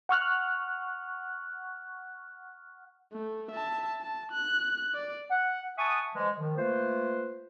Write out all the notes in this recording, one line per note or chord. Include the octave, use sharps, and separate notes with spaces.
F#5 C#6 F6 F#6
A3
E5 A5
A5
F#6
D5
F#5
E5 F#5 G#5 A5 C#6 D#6
E3 F3 G#3
D#3 F3
A3 A#3 F4 B4 C5